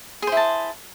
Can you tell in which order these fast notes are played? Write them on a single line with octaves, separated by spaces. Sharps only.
G#4 C5 E4 A5